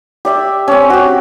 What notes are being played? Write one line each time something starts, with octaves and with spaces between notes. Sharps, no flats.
G4 D5 E5
C4 C#4
F#4 G4